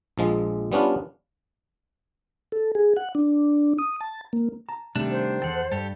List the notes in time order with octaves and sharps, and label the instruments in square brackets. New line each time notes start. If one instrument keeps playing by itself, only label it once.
[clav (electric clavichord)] A#1 F3 G#3
G3 B3 C#4 D4 F4
[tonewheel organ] A4
G#4
F#5
D4
D#6
A5
A#3
[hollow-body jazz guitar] A5 A#5
[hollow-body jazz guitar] C3 G3 A3 [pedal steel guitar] D#3 D4
[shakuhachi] C5
[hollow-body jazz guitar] E2 G5 [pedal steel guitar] A4 F#5
[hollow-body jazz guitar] G2 [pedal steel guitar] G4 A4